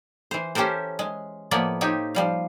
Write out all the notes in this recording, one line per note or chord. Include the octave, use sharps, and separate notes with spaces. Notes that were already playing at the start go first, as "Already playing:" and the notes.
E3 C5
C#4 G4 A4 A#4 C5
G#3
A2 F3 A#3 B3 E4 D5
C4 D#4 G4 C#5
F3 G3 F5